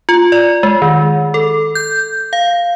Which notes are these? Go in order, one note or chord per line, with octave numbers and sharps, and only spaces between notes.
F4
D5
G#3
D#3
A4
G6
F5